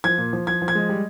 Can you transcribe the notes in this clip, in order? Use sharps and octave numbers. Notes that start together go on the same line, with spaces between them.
F3 G#6
A#2
F3
F3 G#6
F3
G#6
G#3
G3